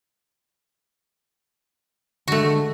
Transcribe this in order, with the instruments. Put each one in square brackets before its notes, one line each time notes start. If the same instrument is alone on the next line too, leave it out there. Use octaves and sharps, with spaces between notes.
[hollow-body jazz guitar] D3 G#3 [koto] A3 F#4